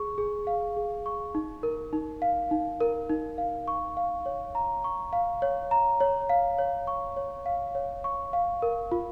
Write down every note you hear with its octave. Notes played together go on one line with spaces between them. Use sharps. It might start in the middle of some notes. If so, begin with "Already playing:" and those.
Already playing: G#4 C#6
G#4
F5
G#4
C#6
D#4
A#4
D#4
F5
D#4
A#4
D#4
F5
C#6
F5
C#5
A#5
C#6
F5
C#5
A#5
C#5
F5
C#5
C#6
C#5
F5
C#5
C#6
F5
A#4
F4